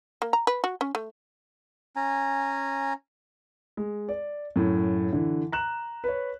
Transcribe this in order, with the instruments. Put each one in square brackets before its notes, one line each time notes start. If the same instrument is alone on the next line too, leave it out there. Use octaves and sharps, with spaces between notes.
[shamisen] A#3
A#5
B4
F#4
C#4
A3
[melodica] C#4 G#5 A#5
[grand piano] G#3
D5
F#2 A2
D3 E3
A#5 F#6 E7
B4 C#5